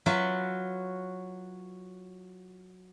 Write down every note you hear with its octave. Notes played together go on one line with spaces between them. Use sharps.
F#3 F4 F#4 B4 E5